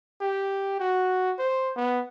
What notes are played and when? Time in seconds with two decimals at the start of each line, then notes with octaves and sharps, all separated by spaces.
0.21 G4
0.80 F#4
1.39 C5
1.76 B3